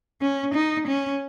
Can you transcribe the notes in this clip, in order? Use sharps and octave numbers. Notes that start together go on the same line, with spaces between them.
C#4
D#4
C#4